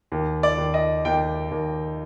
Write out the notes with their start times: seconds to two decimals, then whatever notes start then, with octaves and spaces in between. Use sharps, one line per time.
0.12 D#2
0.43 D5
0.58 D#2
0.74 D#5
1.05 D#2 G5
1.51 D#2